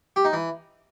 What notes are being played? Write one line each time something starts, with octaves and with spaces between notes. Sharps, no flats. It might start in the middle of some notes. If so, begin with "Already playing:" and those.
G4
D#4
E3